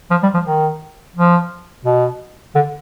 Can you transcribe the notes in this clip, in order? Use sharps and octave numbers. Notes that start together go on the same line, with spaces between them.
F3
G3
F3
D#3
F3
B2
D3